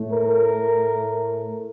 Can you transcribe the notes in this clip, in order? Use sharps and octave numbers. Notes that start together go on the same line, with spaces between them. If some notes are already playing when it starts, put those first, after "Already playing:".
Already playing: A2 A3
A#4